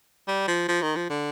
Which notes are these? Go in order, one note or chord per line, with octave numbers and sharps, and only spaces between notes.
G3
F3
F3
D#3
F3
D3